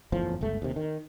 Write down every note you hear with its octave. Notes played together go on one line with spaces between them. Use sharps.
F#1 E2 A2 F3
G1 C#2 A3
D#2 C3
D#3